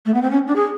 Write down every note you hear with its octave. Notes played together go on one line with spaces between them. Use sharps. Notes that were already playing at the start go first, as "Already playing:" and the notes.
A3
B3
C4
C#4
D4
G#4